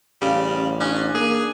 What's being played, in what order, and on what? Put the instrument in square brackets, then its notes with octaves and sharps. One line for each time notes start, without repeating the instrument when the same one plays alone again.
[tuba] A1 [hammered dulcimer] C#3 [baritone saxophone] G3
[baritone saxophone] C#4 [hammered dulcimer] D4
[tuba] A#3 [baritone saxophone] G#4